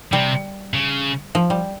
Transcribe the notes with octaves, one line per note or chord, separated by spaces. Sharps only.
C3 G3
C#3
F3
G3